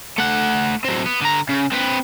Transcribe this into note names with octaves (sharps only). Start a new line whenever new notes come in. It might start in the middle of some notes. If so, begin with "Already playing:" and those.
A3 F#5
F#3 C4
B3
D3 A#5
C#3
C4 B4